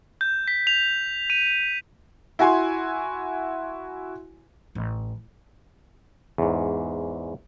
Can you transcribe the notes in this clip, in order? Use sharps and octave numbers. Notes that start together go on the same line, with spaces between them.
G6
B6
F7
D#7
E4 F#4 G#5 C6
A1
E2 G#2